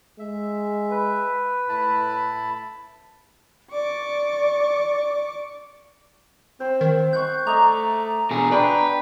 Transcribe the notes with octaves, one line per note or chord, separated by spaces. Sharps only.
G#3 E5
B4
A2 E4 A5 B5
D5 C#6 D6
C4 C5
D#3
F#5 C6 C#6 G6
A3 D5 D#5 A#5
B2 G#4
D4 F#4 B4 G5